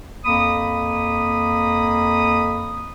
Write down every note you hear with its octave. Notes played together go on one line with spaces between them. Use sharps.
F2 A#3 B5 D#6